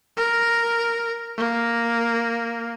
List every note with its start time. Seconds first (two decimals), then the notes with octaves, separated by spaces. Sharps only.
0.17 A#4
1.37 A#3